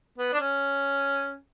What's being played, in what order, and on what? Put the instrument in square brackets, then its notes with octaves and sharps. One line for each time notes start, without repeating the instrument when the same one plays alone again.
[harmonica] B3
D4
C#4